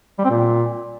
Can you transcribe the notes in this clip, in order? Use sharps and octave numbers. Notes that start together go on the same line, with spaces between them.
G3
C4
A#2